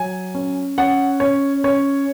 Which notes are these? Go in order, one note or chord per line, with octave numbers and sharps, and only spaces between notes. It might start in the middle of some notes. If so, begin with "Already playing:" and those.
Already playing: F#3 G#5
C#4
C#4 F#5
C#4 C#5
C#4 C#5